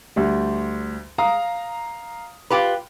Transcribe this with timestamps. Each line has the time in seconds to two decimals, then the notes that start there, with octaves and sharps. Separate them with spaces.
0.16 D2 G3
1.18 F5 A#5 D#6
2.50 F4 G4 B4